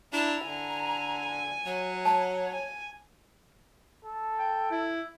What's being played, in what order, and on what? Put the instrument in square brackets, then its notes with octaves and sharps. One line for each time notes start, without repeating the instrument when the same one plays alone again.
[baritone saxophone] D4 [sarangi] E4 [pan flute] A#5
[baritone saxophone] D3 [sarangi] G#5
[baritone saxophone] F#3 [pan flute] C#5
[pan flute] C#5 [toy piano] A5
[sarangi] G#5
[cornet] A4
[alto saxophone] G5
E4